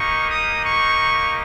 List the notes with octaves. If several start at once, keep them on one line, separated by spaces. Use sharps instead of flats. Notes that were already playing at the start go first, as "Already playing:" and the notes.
Already playing: A#3 D#4 G4 C#6
D#6
C#6